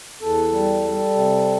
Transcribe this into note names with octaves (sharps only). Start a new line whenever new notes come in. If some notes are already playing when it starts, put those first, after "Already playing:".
E2 A4
G3
G3
C3